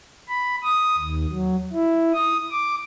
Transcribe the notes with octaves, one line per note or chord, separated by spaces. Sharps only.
B5
D#6
D#2
F#3
E4
D#6
D6